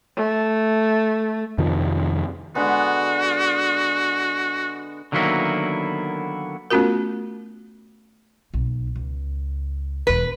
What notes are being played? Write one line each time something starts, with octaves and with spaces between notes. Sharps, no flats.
A3
F2 C3 D#3 F3
D3 G#3 B3 F#4
D3 D#3 F#3 A#3 B3 E4
A3 B3 C#4 F4 F#4 A#4
B1
C#2
E1 E2 B4